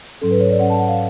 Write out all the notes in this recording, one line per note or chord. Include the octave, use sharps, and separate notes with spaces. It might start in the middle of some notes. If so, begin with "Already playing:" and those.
G#2 F#3 C#4 A4
B4
C#5
D5
G#2 F#3 C#4 F#5
A5
F#5
F5